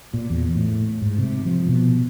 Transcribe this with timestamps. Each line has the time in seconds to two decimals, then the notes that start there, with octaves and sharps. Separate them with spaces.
0.14 A#2
0.30 E2
0.55 A2
1.02 G#2
1.18 C3
1.45 F3
1.68 B2